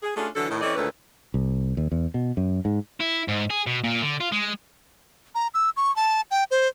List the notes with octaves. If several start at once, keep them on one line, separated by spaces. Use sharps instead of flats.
G#4
A3 C#4 D4 F4 F#4 G#4
D3 E3 F#3 A4
A2 D#3 E4
E3 C4 C#4 A4 D5 D#5
D2 A#2 D#3 C#4 A4 B4
C2
D#2
E2
B2
F#2
G#2
E4
G#2
G#4
B2
A#2
D3
F4
G#3
A#5
E6
C#6
A5
G5
C5